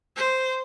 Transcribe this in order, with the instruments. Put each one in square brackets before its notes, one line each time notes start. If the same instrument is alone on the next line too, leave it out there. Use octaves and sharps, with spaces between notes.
[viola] C5